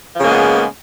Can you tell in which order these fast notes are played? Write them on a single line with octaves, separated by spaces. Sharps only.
F3 C#3 A#3 G#3 B3